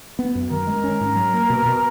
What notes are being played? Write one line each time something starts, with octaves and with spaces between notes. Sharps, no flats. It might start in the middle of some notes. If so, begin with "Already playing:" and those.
B3
F#2
D#3 A#4
G#3
C#4
G#2
F#3
A#3
B2
B2